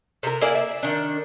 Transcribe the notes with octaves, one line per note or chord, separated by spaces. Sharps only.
C3 A#4
A#3 E4 G#4 D5
E5
D#3 D4